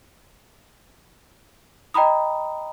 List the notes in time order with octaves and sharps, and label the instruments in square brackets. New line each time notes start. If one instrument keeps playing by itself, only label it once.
[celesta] D#5 G5 A#5 B5 D#6